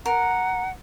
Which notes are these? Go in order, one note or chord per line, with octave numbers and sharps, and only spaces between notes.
A#4 F#5